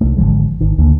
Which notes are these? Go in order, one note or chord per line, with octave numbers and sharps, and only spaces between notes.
C2 A3
G#1 D3 F3 G#3
G#1 D#3
D2 D3 A#3